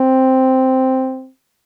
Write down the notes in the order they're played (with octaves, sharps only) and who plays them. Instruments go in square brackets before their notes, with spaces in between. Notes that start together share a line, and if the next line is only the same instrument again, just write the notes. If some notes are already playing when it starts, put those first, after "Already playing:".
Already playing: [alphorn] C4